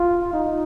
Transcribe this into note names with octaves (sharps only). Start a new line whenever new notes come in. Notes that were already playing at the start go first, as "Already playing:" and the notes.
Already playing: F4
D#4